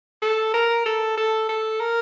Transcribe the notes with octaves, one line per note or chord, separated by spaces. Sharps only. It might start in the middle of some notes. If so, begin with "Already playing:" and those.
A4
A#4
A4
A4
A4
A#4